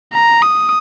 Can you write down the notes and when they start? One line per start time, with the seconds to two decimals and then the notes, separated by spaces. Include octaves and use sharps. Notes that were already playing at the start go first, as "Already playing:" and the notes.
0.14 A#5
0.42 D#6